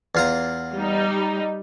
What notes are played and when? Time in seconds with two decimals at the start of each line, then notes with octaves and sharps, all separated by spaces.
0.15 E2 F4 A#5
0.77 G3 D#4